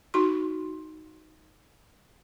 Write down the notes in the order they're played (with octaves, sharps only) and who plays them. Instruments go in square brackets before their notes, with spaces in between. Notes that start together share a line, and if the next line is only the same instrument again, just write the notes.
[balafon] D#4 F#4 C6